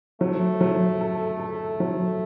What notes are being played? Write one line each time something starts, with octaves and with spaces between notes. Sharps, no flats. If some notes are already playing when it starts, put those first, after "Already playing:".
F#3 A3
F#3
A4
A4
F#3